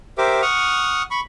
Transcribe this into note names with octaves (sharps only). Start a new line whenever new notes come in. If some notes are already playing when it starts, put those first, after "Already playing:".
G4 A#4 C5 E5 D6
F#5 C#6 D#6 F6
B5 C#6